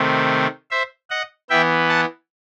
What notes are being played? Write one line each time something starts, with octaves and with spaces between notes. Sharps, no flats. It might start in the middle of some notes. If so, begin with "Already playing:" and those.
Already playing: C3 D#3 A3 C4
C5 E5
D#5 F#5
E3 B3 E5 G5
F#5 A5